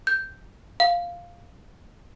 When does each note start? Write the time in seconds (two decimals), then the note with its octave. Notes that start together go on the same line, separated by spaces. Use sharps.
0.07 G6
0.80 F5